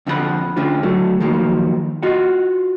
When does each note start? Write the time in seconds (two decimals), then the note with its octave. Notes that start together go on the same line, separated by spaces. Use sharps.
0.07 F2 D3 F3 D#4 F#5 B5
0.57 D3 A3 C#4 D4 F4
0.83 D3 F#3 A3
1.20 D#3 F3 F#3 A#3
2.03 F4 F#4 D#5 F#5